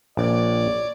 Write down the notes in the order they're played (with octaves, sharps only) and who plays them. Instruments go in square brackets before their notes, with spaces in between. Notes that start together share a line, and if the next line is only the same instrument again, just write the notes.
[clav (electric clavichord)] A#1 [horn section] C#5 D5